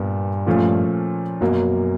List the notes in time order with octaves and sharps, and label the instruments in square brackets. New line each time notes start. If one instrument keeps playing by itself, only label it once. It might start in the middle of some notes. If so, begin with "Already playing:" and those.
Already playing: [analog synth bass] G2 [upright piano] A#2 B3
[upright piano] A#2 F3 A3 C#4 F4
[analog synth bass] F#2 [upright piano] B2 F#3 A#3